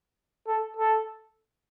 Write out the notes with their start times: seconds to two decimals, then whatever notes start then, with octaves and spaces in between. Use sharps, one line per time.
0.47 A4
0.77 A4